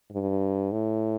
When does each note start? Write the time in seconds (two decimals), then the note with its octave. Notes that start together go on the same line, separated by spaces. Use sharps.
0.12 G2
0.72 A2